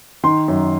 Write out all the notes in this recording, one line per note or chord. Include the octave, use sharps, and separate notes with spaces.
D#3 C6
F#2